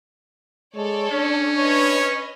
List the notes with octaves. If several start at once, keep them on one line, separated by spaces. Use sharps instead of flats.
G#3 A4 C#5 D5
C#4 D4
B4 C#5 D#5